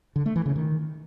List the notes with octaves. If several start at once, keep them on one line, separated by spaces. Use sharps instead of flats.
D3
A3
E3
C#3
D#3